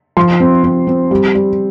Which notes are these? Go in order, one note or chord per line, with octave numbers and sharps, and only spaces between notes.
F3 C6
C4
C4
C4
G3
G3